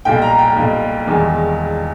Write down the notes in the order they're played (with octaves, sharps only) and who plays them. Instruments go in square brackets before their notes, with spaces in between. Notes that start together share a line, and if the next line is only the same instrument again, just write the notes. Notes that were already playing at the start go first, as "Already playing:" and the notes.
[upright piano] B1 A#2 G3 G5
A#5
G5
B1 A#2 G3
E1 E2 D#3 G3